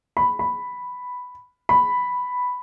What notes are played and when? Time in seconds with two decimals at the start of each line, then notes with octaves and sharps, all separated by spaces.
0.17 B5
0.39 B5
1.69 B5